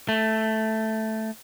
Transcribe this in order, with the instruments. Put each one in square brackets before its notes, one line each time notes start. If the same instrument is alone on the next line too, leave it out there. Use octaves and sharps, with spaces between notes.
[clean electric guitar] A3